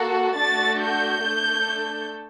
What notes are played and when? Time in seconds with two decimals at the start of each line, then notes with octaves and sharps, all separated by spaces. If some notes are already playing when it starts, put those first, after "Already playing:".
Already playing: A#3 F#4 A4
0.37 A3 D4 F#4 A6
0.82 G6
1.26 A3 D4 A4